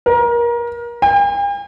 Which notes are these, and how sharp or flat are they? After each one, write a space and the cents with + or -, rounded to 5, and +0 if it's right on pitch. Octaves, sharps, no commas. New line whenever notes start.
A#4 +30
G5 +45